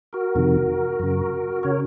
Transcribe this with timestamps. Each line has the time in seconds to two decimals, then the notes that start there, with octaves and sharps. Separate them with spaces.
0.13 F#4 A#4
0.35 F2 C3 D#3
0.99 F#2 C#3
1.63 C#3 A#4 C#5